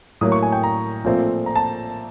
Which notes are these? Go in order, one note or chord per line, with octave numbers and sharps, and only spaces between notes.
A2 F#3 A#3 D#6
C#6
G#5
G5
A#5
A#2 F3 A3 C4
A#5
A5